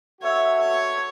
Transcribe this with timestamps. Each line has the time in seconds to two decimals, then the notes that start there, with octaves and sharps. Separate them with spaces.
0.21 F#4 A4 C#5 E5
0.60 C#5